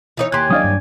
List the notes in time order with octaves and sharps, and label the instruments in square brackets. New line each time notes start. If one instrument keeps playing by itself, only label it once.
[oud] E3 D#4 C#5
[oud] D#2 G4 [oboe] G#5 [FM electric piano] C6 F#6
[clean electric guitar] F#3 D4 D5 [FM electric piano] D#5 F5 D#6
[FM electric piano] G2